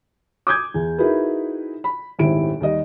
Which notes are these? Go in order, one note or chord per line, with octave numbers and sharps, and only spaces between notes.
D6 D#6 G6 G#6
E2
D#4 E4 F#4 G#4 A#4 B4
B5
D#1 G#1 E4 D7
D#2 G3 D#5